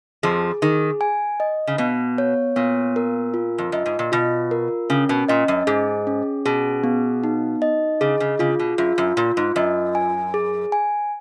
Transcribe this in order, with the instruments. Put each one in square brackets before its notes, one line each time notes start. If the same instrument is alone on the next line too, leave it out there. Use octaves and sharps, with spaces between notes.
[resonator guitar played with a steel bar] F2 F3 [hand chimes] G#4
[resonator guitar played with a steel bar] D#3 [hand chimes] G#4
[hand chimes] G#5
D#5
[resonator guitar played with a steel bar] C#3
[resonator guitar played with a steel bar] B2 [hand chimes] B3
[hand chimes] C#5
[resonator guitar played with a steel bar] A#2 [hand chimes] B3
[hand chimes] A#4
F4
[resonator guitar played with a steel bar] F2
[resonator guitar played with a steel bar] F#2 [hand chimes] D#5
[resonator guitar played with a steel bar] G#2
A#2
[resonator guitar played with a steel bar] B2 [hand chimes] F4
[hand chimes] A#4
[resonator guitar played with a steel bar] C#3 [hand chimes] C#4
[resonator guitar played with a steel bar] B2
[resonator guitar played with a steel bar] A#2 [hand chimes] D#5
[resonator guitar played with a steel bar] F#2
[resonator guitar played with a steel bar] G#2 [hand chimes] G#4
[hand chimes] C#4
[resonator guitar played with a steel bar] B2 [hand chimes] G#4
[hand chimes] B3
D#4
D#5
[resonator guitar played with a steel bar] C#3 [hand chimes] G#4
[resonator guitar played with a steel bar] C#3
[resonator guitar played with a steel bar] C#3 [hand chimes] F4
[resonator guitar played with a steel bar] B2
[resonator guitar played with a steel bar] F#2 [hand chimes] F4
[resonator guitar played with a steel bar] F#2
[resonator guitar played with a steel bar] A#2 [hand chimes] F4
[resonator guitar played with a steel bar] G#2
[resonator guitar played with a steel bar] F#2 [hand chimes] D#5
[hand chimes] G#5
G#4
G#5